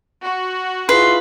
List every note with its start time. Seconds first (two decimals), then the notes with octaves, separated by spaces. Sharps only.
0.24 F#4
0.89 E4 F4 G#4 B4 C6